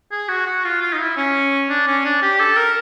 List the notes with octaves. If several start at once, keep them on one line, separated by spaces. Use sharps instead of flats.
G#4
F#4
F#4
F4
F4
D#4
E4
C#4
D4
C#4
D4
G4
A4
A#4